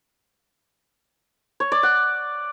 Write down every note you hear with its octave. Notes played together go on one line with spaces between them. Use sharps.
C#5
D5
F#5